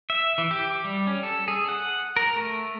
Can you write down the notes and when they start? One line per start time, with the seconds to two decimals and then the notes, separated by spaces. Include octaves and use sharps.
0.10 E5
0.38 E3
0.51 G4
0.84 G3
1.07 C#4
1.23 A4
1.48 G#4
1.69 F#5
2.17 A#4
2.36 A3